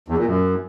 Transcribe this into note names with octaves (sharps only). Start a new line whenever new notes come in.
E2
A#2
F#2